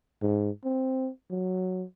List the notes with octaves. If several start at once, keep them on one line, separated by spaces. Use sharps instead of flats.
G#2
C4
F#3